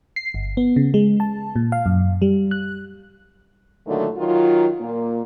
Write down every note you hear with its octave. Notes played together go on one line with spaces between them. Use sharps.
C7
G1
B3
C#3
G#3
A5
A#2
F5
F#2
G3
F#6
A#2 D3 D#3 F#3 A3
D#3 F#3 F4
A#2 A#3